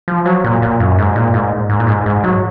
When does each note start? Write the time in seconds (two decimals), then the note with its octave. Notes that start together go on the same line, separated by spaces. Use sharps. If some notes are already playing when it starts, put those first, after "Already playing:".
0.08 F3
0.26 F#3
0.44 A#2
0.62 A#2
0.80 F#2
0.99 G#2
1.16 A#2
1.34 G#2
1.69 G#2
1.80 A#2
1.87 G#2
2.06 G#2
2.24 F#3